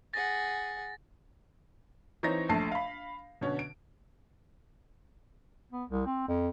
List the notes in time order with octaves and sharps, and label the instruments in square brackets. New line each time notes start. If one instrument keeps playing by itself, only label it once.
[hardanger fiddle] G#4 F#5 [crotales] A6 A#6
[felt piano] E3 C4 D#4 C#5 A#6
A#1 A3 A5 C7
F5 B5
B2 D3 C#4
D7
[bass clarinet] B3
C2
C4
F2